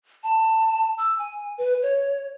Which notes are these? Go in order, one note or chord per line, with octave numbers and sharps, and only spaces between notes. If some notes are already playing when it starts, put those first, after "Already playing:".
A5
E6
G#5
B4
C#5